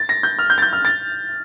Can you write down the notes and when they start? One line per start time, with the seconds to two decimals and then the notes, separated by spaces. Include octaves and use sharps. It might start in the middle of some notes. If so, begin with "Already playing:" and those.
Already playing: A6
0.09 A#6
0.23 G6
0.38 F6
0.50 G6
0.58 A6
0.62 G6
0.73 F6
0.85 A6